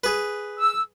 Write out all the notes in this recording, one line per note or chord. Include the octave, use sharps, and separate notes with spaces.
G#4 B4
E6